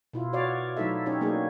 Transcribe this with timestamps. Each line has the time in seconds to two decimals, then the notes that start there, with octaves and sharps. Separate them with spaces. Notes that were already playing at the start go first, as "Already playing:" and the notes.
0.13 B2 E4 F4
0.33 F#4 C#5 D5 F5
0.77 F#3 A3 D#4 E4 A4 E5
1.06 C#4 D#4 G4 C#5
1.21 F#3 A#3 B3 D4 D#4 G#4